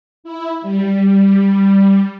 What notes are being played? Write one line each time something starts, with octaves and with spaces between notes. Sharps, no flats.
E4
G3